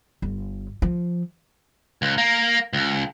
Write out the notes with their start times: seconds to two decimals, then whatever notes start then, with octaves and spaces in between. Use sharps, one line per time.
0.22 G1
0.82 F3
2.02 C#2
2.18 A#3
2.73 C#2